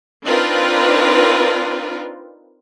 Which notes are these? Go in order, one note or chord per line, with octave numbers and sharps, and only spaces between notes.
C4 D4 D#4 F4 A#4 B4